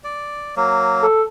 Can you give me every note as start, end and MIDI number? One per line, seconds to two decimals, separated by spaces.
0.04 0.55 74
0.57 1.06 54
0.57 1.06 58
1.02 1.23 69